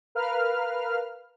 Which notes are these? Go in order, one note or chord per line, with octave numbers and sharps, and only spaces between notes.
A#4 B4 F5 F6